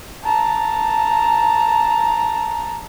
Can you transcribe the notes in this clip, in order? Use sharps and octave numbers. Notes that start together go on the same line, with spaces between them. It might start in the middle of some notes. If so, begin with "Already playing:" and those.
A5 A#5